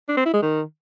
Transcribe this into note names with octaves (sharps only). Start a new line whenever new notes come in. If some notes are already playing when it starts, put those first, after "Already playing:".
D4
C4
E4
G#3
D#3